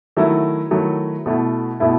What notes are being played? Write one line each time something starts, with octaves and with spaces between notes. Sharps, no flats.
D#3 F#3 A3 E4
D#3 F#3 A3 E4
B2 A3 E4
B2 A3 E4